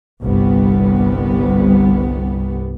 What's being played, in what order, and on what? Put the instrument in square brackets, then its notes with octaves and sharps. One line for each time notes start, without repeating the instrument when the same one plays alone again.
[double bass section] G1 C2 G3 B3